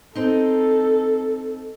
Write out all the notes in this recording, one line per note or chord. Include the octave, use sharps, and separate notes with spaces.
C4 D#4 A4